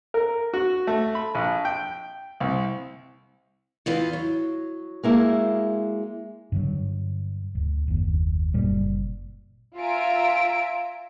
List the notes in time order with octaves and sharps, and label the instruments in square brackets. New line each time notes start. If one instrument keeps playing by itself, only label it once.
[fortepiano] A#4
F#4
A3
B5
A#1
G5
C2
[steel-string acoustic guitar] E2 E3 F4
F#3
[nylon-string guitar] G#3 A#3 E4
[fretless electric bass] G2 D3 F#3
D1
F#1 D#2
F#1 A#2 G3
[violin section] F4 E5 G#5 A#5 E6 D7